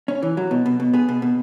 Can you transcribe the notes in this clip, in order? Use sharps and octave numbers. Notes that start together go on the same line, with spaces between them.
C#4
E3
F#3
B2
B2
B2
B3 G#4
B2
B2